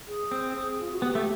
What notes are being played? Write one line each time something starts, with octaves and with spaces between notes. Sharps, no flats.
G#4
C4
F4
F#4
B3 G4
A3